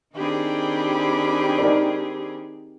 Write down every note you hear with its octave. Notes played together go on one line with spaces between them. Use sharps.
D#3 C4 D4 G4 G#4 B5
D#4 A#4 D5